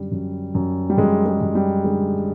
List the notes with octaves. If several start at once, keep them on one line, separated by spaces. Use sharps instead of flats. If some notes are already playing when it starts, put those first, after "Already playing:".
Already playing: F#2 D3 G3
F#2
F#2
G3
F#2 G#3
G#3
F#2
G3
D3 G#3